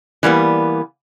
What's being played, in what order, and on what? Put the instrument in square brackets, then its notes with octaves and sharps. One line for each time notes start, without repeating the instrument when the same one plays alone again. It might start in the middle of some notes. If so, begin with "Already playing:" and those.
[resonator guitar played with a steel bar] E3 G3 A#3 B3